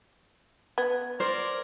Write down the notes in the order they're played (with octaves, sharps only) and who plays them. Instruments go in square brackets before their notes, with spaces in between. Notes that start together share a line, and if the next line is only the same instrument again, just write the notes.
[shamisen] B3 [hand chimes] G#6
[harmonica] A#4 D5 [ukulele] C5